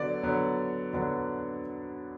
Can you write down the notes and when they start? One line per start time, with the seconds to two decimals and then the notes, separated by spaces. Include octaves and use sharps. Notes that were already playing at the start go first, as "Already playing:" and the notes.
Already playing: D3 F#3 B3 D4 D5
0.23 D3 F#3 B3 D4
0.93 D3 F#3 B3 D4